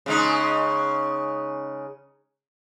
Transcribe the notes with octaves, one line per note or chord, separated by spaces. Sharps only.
C#3 G#3 D#4